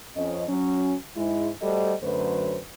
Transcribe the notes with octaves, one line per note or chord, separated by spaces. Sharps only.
F2 C#4 D#5
F#3 C#4
G#2 G#3 E4
G3 A3 F#4 A4 C5 D#5
F#2 D3 F#3 A3 B4 C5